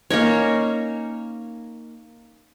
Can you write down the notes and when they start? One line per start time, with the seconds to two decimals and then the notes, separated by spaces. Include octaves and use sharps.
0.10 A#3 C#4 D#4 C#5